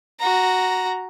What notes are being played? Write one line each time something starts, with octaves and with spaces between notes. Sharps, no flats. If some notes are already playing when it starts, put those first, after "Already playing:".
F#4 A#5